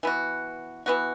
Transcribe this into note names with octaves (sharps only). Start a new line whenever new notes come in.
E3 B3 F#4
E3 B3 F#4